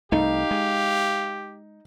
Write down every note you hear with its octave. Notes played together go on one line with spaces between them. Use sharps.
C2 A3 D#4 G4 F5
G#3